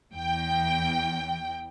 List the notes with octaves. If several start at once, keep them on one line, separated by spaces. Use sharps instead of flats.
E2 G5